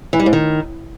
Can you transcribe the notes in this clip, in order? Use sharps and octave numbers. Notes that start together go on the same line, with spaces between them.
E3
G3
G#2
D#3